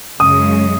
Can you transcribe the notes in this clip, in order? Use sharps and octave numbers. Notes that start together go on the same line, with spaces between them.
F#2 C#3 G#3 D#6